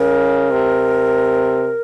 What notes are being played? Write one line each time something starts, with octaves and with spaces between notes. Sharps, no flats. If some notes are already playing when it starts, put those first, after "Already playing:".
Already playing: C#3 A#4
C3